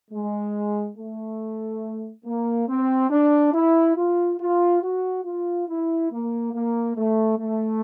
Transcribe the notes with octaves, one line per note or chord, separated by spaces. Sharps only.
G#3
A3
A#3
C4
D4
E4
F4
F4
F#4
F4
E4
A#3
A#3
A3
A3